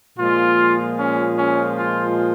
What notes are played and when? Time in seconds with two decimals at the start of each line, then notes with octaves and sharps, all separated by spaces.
0.18 A#2 F3 G#3 F4
0.97 C#4
1.37 C#4
1.77 F4